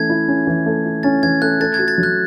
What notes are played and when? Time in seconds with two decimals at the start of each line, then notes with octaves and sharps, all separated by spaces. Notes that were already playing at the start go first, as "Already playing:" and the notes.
Already playing: E3 A3 C#4 G#6
0.10 E4
0.28 C#4
0.47 E3
0.66 A3
0.85 E4
1.03 C#4 A6
1.23 E3 G#6
1.42 A3 F#6
1.60 A4 A6
1.74 F#4 G#6
1.88 A6
1.98 F#3
2.03 F#6